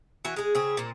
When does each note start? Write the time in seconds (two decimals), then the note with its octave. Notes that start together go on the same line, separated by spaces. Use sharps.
0.25 E3 F#4 G#5
0.36 G#3 G#4
0.55 C#3 C4 G#4
0.77 A#2 C4